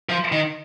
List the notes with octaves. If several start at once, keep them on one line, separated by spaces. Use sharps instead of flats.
F3
D#3